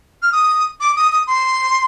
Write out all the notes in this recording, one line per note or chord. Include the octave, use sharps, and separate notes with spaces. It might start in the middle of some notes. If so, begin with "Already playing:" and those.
F6
D#6
D6
D#6
D#6
C6